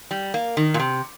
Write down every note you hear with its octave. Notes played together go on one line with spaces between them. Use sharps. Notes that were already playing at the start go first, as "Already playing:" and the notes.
G3
A#3
D#3
A#2
C3